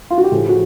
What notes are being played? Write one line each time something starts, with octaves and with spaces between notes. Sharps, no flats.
F4
F#4
G4
A2 F3 G#4
F#4